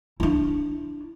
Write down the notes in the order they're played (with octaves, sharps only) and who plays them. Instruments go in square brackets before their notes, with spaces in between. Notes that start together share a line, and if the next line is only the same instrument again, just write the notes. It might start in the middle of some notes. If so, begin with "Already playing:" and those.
[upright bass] D4 E4